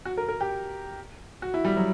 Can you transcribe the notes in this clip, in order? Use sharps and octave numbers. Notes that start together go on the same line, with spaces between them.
F#4
A#4
A#4
G4
F#4
E4
G3
F#3